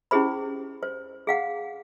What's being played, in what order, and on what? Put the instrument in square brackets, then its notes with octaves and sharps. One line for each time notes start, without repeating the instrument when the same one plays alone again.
[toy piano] C#4 E4 G4 G#4 C5 B5
C5
G#4 F5 F#5